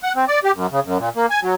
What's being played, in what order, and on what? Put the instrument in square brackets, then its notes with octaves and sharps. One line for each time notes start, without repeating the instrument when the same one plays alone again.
[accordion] F#5
C4
D5
G4
F#2
C#3
F#2
A#2
A#3
G#5
F#3